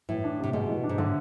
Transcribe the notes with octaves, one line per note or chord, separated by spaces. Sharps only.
A2 E3
D4
A2 C3
B2 G#3
E3
D4
G#2
A2 D3